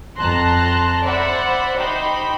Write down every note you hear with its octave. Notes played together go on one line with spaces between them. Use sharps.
F2 A5 A#5 C6 F#6 A#6
C5 D5 E5 F#5 B5
D#4 G4 C5 B5